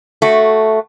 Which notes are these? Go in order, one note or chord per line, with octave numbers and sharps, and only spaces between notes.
A3 F#4